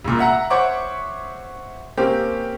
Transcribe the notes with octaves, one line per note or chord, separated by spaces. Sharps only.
E1 A#2
E5 F#5 A#5
C5 C#5 E5 F#5 C#6 D6
A#3 C4 C#4 G4